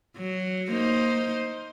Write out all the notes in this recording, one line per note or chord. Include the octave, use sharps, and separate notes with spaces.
F#3
A#3 D#4 C5